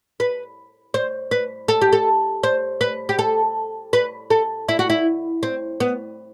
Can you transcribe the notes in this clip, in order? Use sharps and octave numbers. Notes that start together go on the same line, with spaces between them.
B4
C5
B4
A4
G4
A4
C5
B4
G4
A4
B4
A4
E4
F#4
E4
C4
B3